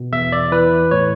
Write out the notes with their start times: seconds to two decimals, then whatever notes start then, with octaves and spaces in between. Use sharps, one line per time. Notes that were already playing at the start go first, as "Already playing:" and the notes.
Already playing: B2
0.12 E2 E5
0.32 D5
0.52 E3 B4
0.91 A2 C#5